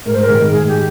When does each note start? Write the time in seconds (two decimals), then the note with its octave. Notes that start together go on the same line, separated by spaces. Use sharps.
0.06 G#2 A#4
0.13 C5
0.22 A#4
0.29 D#3 G#3
0.52 G#2 G#4
0.68 G4